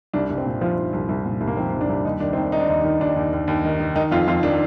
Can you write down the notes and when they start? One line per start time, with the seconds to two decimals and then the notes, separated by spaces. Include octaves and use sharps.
0.14 C2 D4
0.30 C2
0.38 C4
0.46 A#2
0.61 F3 F4
0.78 F3
0.93 C2
1.09 C2
1.26 A#2
1.41 C2
1.47 A#3
1.57 F3 C4
1.73 C2
1.81 D4
1.89 C2
2.05 D#2 D#4
2.20 D#3 D4
2.33 C4
2.37 D#3 D4
2.52 D#3 D#4
2.60 D4
2.68 D#2 D#4
2.84 D#3
3.00 D#2 D4
3.16 D#2
3.33 D#2
3.48 D#2
3.65 D#3
3.80 D#3
3.96 D#3 D#4
4.11 F2 F4
4.27 F2 F4
4.43 D#3 D4